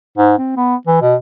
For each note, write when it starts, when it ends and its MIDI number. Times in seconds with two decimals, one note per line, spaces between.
0.18 0.35 44
0.38 0.56 60
0.57 0.75 59
0.87 0.98 52
1.02 1.15 47